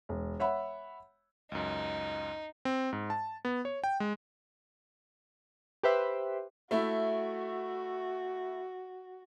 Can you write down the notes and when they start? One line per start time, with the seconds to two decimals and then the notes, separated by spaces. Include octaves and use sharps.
0.09 E1
0.40 C#5 E5 F#5 B5
1.52 C#2 F#2 D#4
2.65 C4
2.93 G#2
3.10 A5
3.45 B3
3.65 C#5
3.84 G5
4.00 G#3
5.83 G4 B4 C5 E5
6.71 A3 E4 F#4